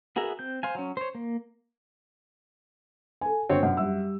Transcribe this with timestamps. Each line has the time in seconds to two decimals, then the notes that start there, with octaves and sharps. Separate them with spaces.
0.16 B3 F#4 G#4 A#4 E5
0.39 C4 G6
0.63 C5 F5 G#5
0.75 F#3 C#4
0.97 C5 C#5
1.15 A#3
3.21 A4 G#5
3.49 G1 C4 F#4 C#5
3.63 F#2
3.77 G3 E5 E6